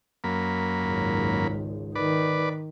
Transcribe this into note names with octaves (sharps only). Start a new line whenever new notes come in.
F#2 A#3 B5
G#1 C#2
D#3 B4 D5